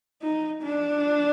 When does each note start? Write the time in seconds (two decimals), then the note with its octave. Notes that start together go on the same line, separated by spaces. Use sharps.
0.22 D#4
0.62 D4